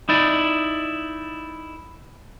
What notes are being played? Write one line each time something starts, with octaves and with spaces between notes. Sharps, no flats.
D#4 E4 D5